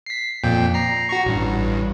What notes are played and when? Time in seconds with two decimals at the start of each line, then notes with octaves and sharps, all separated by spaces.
0.06 B6 C7
0.44 F2 A#2 G5
0.74 A#5 C7
1.09 F#4 A#5 C#6
1.25 A1 G2